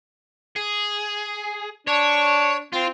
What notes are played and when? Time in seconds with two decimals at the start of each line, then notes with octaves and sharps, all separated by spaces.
0.56 G#4
1.87 D4 C#5
2.73 C4 F4